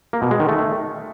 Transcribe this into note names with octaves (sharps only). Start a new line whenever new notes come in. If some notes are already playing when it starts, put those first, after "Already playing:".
A#3
B2
G#3
D#3
A3